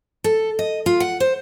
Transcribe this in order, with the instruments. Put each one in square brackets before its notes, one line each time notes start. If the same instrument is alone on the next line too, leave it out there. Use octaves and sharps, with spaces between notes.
[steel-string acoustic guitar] A4
D#5
F4
F#5
C5